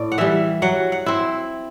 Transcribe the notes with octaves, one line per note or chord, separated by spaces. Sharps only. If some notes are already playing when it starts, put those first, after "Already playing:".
Already playing: A2 D5
F#5
E3 G3 E5
F#3 F#5
F#5
C4 E4